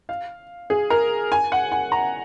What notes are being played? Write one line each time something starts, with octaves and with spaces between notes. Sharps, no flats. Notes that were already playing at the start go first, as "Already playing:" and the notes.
F5
G#4
A#4
G#5
F#5
G#5
A#5